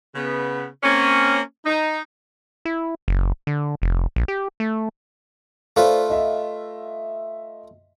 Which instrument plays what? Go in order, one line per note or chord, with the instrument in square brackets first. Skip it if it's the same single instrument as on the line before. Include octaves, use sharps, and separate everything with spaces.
[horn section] C#3 B3
A#3 C4 C#4
D#4
[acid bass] E4
F#1
D3
F1
A#1
G4
A3
[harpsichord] A3 F4 B4 [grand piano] C5 D5
[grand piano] D#5 E5